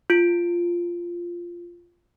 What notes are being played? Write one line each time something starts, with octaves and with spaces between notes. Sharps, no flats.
F4 D7